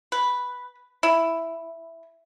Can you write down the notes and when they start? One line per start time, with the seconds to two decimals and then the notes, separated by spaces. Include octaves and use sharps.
0.12 B4
1.03 E4